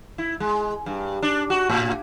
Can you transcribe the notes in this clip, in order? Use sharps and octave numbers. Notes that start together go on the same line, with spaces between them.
E4
G#3
G2
D4
F#4
A2